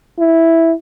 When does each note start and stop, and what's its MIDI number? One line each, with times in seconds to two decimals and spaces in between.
0.20 0.73 64